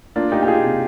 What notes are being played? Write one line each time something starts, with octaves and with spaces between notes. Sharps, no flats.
A#3 D4 F4
A#3 D#4 G4
G4
A#3 F4 G#4
C3